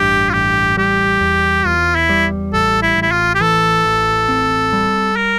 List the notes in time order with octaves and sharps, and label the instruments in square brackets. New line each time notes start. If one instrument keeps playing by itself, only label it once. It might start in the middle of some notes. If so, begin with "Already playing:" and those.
Already playing: [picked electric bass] A1 G2 [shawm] G4
[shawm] F4
[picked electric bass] A1 [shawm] G4
[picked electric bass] G3 [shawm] G4
[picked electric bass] E2
[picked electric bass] E2 [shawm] F4
[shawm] E4
[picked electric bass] G3
[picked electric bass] A1 [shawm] A4
[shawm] E4
[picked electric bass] A1
[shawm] E4
F4
G4
[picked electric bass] E3 [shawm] A4
[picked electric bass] A1
C4
G3
[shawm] A#4